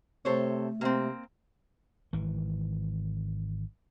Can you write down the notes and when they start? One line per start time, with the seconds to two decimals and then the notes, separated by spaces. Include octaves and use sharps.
0.25 C3 A3 A4 C5 C#5
0.81 C3 A#3 C4
2.13 G#1 E3